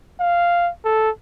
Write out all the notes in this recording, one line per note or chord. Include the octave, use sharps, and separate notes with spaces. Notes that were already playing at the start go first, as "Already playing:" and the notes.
F5
A4